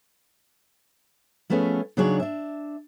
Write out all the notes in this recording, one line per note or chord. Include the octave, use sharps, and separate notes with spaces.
F3 A3 B3 C#4 G#4
C#3 F#3 D4 D#4 G#4 C#5
D4 E5